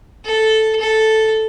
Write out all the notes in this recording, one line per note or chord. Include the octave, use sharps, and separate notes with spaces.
A4
A4